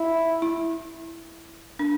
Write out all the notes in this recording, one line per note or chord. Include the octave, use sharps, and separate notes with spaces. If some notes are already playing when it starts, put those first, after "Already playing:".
Already playing: E4
E4
D4